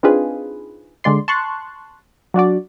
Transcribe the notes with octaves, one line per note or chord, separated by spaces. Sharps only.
C4 D4 D#4 F4 G#4 B4
D3 G#3 D5 C6
A5 C6 C#6 F#6
F#3 D4 F#4 D5